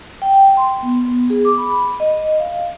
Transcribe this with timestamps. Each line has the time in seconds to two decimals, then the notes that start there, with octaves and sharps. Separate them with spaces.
0.22 G5
0.57 C6
0.83 B3
1.30 G#4
1.45 D6
1.58 B5
2.00 D#5
2.39 F5